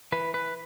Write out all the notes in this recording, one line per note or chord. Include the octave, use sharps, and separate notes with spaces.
E3 B4
B4